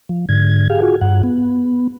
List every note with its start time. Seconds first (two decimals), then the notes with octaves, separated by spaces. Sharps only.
0.09 F3
0.29 G#2 D3 G#6
0.70 G4 G#4 F5
0.82 F4 F#4 G#4
1.01 G2 F#5
1.23 B3